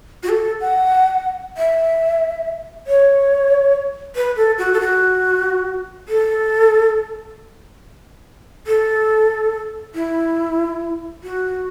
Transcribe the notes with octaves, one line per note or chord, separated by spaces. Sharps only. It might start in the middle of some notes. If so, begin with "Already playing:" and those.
F#4
A4
F#5
E5
C#5
B4
A4
F#4
A4
F#4
A4
A4
E4
F#4